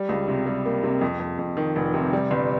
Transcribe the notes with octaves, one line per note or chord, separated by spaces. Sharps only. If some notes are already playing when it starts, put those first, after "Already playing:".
Already playing: G3
C#2
C3
G3
A#3
C3
F2
F2
F2
D#3
F1
C3
G3
G1